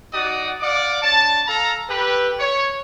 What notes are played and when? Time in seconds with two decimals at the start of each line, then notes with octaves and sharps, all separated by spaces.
0.13 D#4 F#4 D5 F#5 D#6
0.61 D5 F5 F#5 D6
1.03 D4 C#5 A5
1.47 A4 F5 A#5
1.90 G4 A4 B4
2.39 C#5